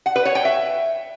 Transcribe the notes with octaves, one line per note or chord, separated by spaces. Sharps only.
F#5
B4
C#5
G5
E5